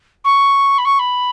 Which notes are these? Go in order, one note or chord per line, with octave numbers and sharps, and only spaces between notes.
C#6
B5
C#6
B5